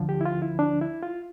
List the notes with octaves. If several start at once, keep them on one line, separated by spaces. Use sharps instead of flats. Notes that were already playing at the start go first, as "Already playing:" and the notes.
Already playing: D2 D3 F3
G4
E4
F4
E4
D4
E4
F4